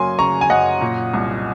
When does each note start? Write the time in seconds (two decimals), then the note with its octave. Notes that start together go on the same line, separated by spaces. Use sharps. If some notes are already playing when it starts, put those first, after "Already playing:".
Already playing: F#2 C#3 F#3 A#3 G#5 C6
0.19 C#3 A#5 C#6
0.41 G#5
0.50 F#2 D#5 F#5
0.81 A#2
1.13 C2